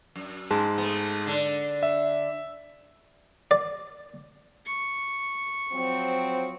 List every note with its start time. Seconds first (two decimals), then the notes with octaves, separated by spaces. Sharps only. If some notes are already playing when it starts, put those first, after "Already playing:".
0.16 F#2
0.51 G#2 G#3 A5
0.78 A3 B3
1.26 D3 D4
1.83 E5
3.51 D5
4.65 C#6
5.71 F3 F#3 C4